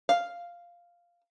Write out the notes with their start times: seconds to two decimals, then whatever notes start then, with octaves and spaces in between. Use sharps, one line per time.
0.09 F5